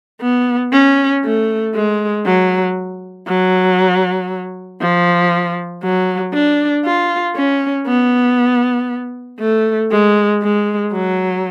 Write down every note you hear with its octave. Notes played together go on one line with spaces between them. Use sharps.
B3
C#4
A3
G#3
F#3
F#3
F3
F#3
D4
F4
C#4
B3
A3
G#3
G#3
F#3